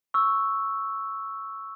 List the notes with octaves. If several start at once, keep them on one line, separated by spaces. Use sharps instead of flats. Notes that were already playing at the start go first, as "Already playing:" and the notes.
C#6 E6